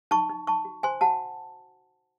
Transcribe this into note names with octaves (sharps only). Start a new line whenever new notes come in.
D#4 A5 C#6
D#4
D#4 A5 C#6
F#4
C5 G#5 C6
F#4 F#5 A5